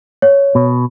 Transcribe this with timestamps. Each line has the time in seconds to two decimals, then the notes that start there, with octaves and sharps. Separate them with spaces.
0.22 C#5
0.55 B2